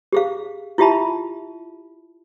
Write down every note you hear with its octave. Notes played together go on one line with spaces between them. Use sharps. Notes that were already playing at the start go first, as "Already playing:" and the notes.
G4 G#4 F5
E4 F4 G4 E5 A5 B5